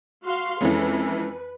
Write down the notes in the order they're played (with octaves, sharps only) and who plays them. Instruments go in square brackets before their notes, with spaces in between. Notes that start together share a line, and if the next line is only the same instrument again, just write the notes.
[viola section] F#4 F5 C6
[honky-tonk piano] F2 E3 [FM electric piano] G#3 C#4 A4 [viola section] B4